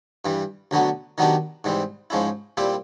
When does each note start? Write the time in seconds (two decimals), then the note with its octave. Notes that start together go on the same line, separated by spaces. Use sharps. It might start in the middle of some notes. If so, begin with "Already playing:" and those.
0.25 G2 E3 G3
0.71 D2 D3 F#3 B3
1.18 D#3 F#3 B3 D4 G4
1.64 G#2 E3 G3 C4
2.10 G#2 F3 G#3 C#4 E4
2.57 A#2 G3 C4 E4 G4